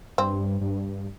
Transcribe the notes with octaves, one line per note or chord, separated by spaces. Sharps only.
G2 C4
G2